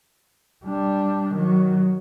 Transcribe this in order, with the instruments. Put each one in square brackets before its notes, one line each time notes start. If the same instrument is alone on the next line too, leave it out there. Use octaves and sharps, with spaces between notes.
[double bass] G3 D4
D#3 F#3